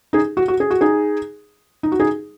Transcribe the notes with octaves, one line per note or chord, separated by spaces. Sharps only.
D#4 G#4
F#4
F#4
G#4
F#4
D#4 G#4
D#4
F#4
D#4 G#4